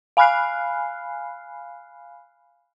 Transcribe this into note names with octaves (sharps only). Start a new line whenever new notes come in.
F5 G#5 B5 F6 F#6 C7